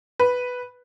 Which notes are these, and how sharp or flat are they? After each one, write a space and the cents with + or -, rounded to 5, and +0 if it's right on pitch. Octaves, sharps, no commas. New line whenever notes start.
B4 +0